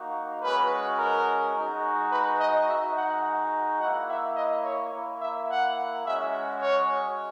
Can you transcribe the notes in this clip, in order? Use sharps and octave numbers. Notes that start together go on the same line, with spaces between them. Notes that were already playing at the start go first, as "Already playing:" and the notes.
Already playing: A#3 D#4 F#4
G#3 C#4 F#4 B4
A#4
G#3 D#4 F#4
B4
D#5
G#3 D#4 F#4 E5
F#5
A#3 E4 F#5
E5
D#5
C#5
A#3 E4
E5
F#5
G#3 C#4 F#4 E5
C#5